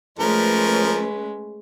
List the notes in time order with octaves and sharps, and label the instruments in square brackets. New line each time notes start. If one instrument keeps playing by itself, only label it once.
[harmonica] F3 A#4 [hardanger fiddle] G#3 [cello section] A3 C#4 B4